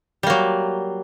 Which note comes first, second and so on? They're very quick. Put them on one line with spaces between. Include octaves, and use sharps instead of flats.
G3 A#3 F#3